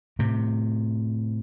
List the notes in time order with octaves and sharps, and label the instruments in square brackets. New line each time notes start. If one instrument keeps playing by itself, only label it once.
[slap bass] A2 C3